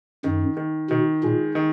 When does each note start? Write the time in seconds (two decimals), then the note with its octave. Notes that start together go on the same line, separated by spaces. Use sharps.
0.24 F#2 D#3
0.57 D#3
0.90 B2 D#3
1.23 A#2 G#3
1.55 D#3